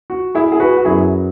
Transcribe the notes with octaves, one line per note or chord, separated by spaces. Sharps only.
F#4
E4 G#4
G#4
F#4 B4
F#4
F#2 F#3 B3 E4 G#4